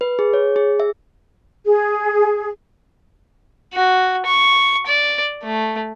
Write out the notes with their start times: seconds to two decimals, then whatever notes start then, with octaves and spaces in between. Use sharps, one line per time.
0.01 B4
0.19 G#4
0.33 C#5
0.56 G#4
0.80 E5
1.65 G#4
3.74 F#4
4.26 C#6
4.87 D5
5.44 A3